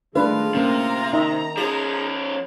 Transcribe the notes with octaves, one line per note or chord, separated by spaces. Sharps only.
D#3 G#3 A3 D4 F4 B4
C3 A#3 C#4 A#5
D#3 D#4 D#5 E5
F3 C#4 G#4